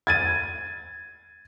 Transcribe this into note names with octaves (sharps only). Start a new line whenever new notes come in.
G#6 A6 D#7